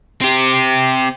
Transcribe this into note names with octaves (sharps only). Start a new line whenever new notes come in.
C4 G4